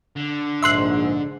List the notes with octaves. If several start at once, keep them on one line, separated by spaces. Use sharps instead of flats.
D3
A#1 G#2 E5 C6 F#6